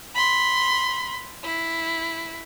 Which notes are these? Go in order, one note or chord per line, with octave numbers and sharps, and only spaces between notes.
B5 C6
E4